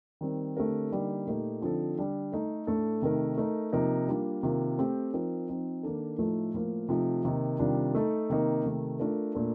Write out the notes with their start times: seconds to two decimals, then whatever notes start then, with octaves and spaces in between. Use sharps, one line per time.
0.21 D#3 G3 C4
0.57 D3 A3 C4 G4 A#4
0.91 D3 G3 A#3 D#4 G4
1.27 A#2 A3 D#4 G4 A#4
1.62 D3 F3 C4 D#4 A4
1.97 D3 G3 D4
2.32 A3 D#4 A4
2.67 A2 A3 D4 A4
3.02 C3 D#3 A3 D#4 A#4
3.38 A3 D#4 A#4
3.73 C3 F3 A#3 D#4 A#4
4.08 G3 A#3 D4 F4
4.43 C3 D#3 A#3 F4
4.78 A3 C4 G4
5.14 F3 C4 D#4 A#4
5.48 F3 C4 D#4
5.83 D#3 A#3 D4 A4
6.18 A2 F3 A3 D#4 A4
6.54 A2 F3 A#3 F4
6.89 C3 F3 A3 D#4
7.25 C3 D#3 A#3 D#4
7.59 C3 D#3 G3 D4 F4
7.95 A3 D#4 A4
8.30 C3 D#3 A#3 D#4
8.64 C3 D#3 A3
9.00 A3 D4 F4 A#4
9.35 A#2 A3 D4 F4 A#4